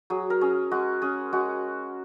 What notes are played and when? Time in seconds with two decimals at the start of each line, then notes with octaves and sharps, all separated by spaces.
0.10 F#3 G#4
0.30 A#4
0.41 C#4 G#4
0.71 G#3 F#4
1.02 C#4 G#4
1.33 G#3 F#4